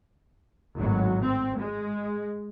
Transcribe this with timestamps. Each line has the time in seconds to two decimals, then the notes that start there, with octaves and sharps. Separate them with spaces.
0.77 G#1 A2 F#3
1.22 C4
1.57 G#3